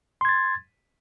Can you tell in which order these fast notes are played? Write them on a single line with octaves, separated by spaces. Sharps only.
C6 G#6 A6